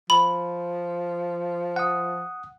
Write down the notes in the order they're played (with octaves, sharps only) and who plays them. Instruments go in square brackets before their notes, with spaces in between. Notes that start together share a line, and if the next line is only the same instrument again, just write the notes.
[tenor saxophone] F3 [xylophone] B5
[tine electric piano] F#5 D#6